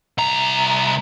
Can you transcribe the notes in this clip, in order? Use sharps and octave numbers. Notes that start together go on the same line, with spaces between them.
C2 A#5